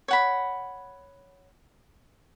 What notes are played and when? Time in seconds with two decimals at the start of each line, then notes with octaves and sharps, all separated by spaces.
0.08 C#5 F#5 B5